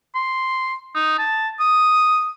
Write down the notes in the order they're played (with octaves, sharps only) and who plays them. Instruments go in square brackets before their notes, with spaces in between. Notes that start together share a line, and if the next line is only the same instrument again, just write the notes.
[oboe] C6
D#4
A5
D#6